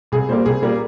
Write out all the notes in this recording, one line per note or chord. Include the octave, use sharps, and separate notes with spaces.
C2 G#4
A#2 G3 A#3 C5
C2 G#4
A#2 G3 A#3